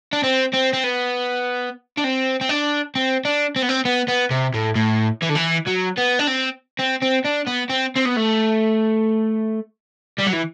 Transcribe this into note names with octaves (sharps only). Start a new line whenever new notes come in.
D4
C4
C4
C4
B3
D4
C4
C4
D4
C4
D4
C4
B3
C4
B3
B3
C3
A2
A2
E3
D3
E3
F#3
B3
D4
C4
C4
C4
D4
B3
C4
C4
B3
A3
G3
F#3
E3